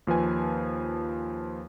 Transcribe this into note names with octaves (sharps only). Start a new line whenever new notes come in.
D#2 F3 B4 G#5